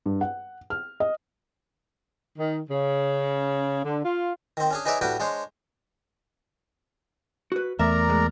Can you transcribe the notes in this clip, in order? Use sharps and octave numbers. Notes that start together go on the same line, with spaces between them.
G2
F#5
F6
D#5
D#3
C#3
D3
F4
D#3 C4
C#4 D4 G#4
D#4 G#4 B4 C#5 D5 E5
A2 G3 D4 F#4 B4 G5
G#3 D4 C5 C#5
F#4 B4
E2 A3 A#4 D5 E5 A#5
A#2 G#3